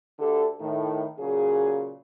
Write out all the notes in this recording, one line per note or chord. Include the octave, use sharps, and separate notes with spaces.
D2 D3 G4 A4
A2 D#3
A#2 C#3 F#3 G#4